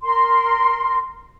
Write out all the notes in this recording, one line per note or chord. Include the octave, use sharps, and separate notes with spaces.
A#4 C6